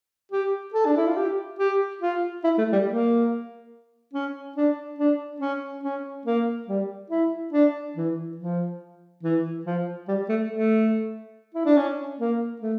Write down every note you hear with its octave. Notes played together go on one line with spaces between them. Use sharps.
G4
A4
D4
E4
F4
G4
G4
F4
E4
A3
G3
A#3
C#4
D4
D4
C#4
C#4
A#3
G3
E4
D4
E3
F3
E3
F3
G3
A3
A3
E4
D4
C#4
A#3
A3